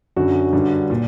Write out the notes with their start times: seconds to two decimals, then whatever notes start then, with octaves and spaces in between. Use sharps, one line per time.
0.17 F#2 D3 F#4
0.53 G2 D3
0.90 A#2